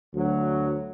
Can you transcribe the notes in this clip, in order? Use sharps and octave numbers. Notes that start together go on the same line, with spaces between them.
D2 F#3